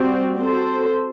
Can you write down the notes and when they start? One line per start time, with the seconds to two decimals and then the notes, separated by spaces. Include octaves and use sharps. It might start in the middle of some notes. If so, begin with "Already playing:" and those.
Already playing: G3 C4 F#4
0.40 C4 F#4 A4 C5